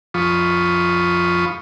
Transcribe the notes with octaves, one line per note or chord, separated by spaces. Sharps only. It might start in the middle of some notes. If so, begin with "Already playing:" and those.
F2 F3 F4 B5 C#6 D#6